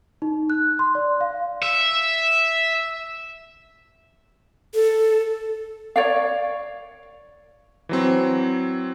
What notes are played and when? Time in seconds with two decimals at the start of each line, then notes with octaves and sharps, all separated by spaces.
0.22 D#4
0.50 F#6
0.79 C6
0.95 D5
1.21 F5
1.63 E5
4.74 A4
5.96 C#5 D5 F5
7.89 E3 F#3 C4